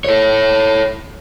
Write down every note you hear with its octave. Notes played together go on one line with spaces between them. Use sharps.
A4 C#5